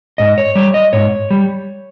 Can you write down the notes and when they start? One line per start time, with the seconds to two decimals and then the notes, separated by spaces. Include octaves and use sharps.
0.18 G#2 D#5
0.38 C#5
0.56 G3 C#5
0.74 D#5
0.93 G#2 C#5
1.31 G3